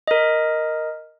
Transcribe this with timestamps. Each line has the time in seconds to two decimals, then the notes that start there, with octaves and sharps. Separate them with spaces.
0.07 A#4 D#5